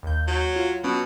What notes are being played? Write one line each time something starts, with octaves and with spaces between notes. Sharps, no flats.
D#2 G6
F#3
F4 C#5
B2 F#3 C#4